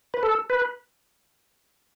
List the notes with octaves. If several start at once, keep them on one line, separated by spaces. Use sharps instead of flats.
B4
A4
B4